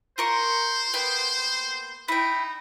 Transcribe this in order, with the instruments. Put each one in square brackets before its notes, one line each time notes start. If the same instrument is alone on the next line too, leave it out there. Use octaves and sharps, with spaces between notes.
[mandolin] F4 A#4 C#6 [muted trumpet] C5
[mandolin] A#3 B3 G5
[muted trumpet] D#4 [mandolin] E4 G5